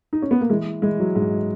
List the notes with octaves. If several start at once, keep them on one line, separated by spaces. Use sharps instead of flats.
D#4
C#4
B3
A#3
E3 G#3
E3 G#3
F#3
G#2 G#3